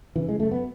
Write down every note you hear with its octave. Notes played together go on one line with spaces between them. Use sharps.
C#3 E3
G#3
F#2 A3
B3